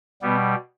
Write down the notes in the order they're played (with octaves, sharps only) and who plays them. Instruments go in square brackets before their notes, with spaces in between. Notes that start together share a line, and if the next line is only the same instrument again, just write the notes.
[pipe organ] B2 G3 B3